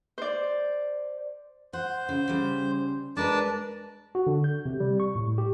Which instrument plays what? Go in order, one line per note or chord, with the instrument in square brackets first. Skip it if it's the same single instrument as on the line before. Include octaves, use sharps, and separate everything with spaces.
[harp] C5 D5
[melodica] C5 [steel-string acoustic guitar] F#5
[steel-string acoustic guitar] C#3
C#3 G3
[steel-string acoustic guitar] G#3 A#4 B4 [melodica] D4 D5 A5
[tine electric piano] F#4
D3
G6
C3
G3
C#6
A2
G4